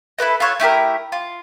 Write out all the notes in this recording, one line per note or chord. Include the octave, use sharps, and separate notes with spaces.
E4 A4 B4 D#5
F4 A4 C#5 F#5
A3 E4 G4 A#4
F4